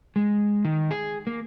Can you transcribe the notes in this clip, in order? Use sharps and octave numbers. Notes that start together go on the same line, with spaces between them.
G#3
D#3
G#4
A#3